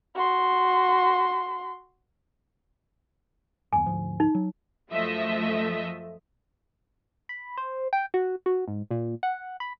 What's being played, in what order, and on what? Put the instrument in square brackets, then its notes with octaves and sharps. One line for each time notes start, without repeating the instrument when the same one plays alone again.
[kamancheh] F#4 C6
[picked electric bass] G1 E2 [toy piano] G#5
[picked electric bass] D2 G#2 F3
[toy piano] D#4
[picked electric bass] F#3
[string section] F#2 F3 A3 D#5 E5
[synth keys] B5
C5
G5
F#4
F#4
G#2
A#2
F#5
B5